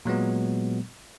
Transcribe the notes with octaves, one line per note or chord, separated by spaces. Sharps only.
A#2 F#3 G#3 B3